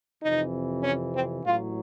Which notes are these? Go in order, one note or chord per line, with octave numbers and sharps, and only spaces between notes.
F2 C3 E3 D#4
C#4
C4
A1 A2 F#3 F4